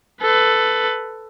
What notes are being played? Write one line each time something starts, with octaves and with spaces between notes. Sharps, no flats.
A4 B4